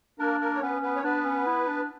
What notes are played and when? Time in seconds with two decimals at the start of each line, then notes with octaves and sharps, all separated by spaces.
0.19 A#3 D4 A#4
0.41 A#3 A#4
0.55 C#5
0.62 B3 C#4 B4
0.82 B3 B4
0.96 C#5
1.04 B3 D4 B4
1.25 C#4
1.47 E4
1.68 D4